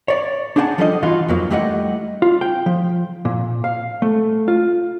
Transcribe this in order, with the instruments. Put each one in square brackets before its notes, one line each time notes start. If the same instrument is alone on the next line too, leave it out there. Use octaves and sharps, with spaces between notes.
[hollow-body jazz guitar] C#5 D5
D4 D#4 G#4 F#5 G5 A5
F3 G3 A4 C5 D5 D#5
E3 D#4 F4 F#4
F2 F#3 A#3
G3 A3 E4 G4 D#5 F#5
F4
G5
F3
A#2
F5
A3
F4